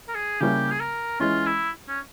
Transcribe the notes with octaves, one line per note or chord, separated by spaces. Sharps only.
A#4
G#4
C#3 G3 A#3 C#4 E4 G4
G#4
A#4
E3 G#3 C#4 F4
E4
C#4